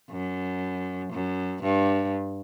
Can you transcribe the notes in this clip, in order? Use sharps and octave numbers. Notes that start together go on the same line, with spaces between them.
F#2
F#2
G2